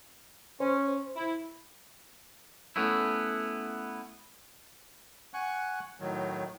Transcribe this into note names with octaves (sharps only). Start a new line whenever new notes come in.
C#4 C5
E4
A3 B3 C#4 E4
F#5 G#5 C#6 F#6
A2 D#3 F#3